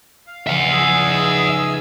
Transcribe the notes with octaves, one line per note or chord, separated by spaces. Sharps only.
F5
C#2 F3 E5 F#5
G#4 G#5 E6
D#4 B4